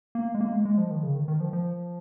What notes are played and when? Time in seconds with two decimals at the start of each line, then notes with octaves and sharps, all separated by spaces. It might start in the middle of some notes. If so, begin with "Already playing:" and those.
0.15 A#3
0.34 G#3
0.41 A#3
0.53 G#3
0.65 G#3
0.78 F3
0.91 D#3
1.03 C#3
1.15 D#3
1.28 D#3
1.40 F3
1.53 F3